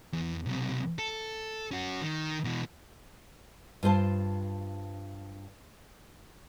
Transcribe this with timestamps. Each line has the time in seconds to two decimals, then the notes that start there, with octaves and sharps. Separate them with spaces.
0.13 E2
0.46 B1 C3
0.98 A4
1.71 C#4 F#4
2.01 D#3
2.44 B2 E3
3.83 G2 F4 C5 A5